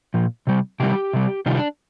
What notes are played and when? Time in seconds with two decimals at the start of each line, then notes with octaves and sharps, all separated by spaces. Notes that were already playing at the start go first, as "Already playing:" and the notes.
0.14 A#2 F3
0.47 C3 G3
0.80 C3 D#3 G3 G4
1.13 C3 G3
1.46 C3 D#3 G3 F4
1.57 D4